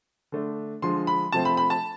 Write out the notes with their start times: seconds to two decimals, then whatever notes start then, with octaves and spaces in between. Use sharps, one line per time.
0.32 D3 A3 D4
0.82 D3 F3 G#3 C6
1.07 B5
1.32 C3 F3 A3 C4 A5
1.45 B5
1.57 B5
1.70 A5